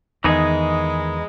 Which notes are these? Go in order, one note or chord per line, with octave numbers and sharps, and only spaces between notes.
E2 D#3 E3 G#3 D#4 G#4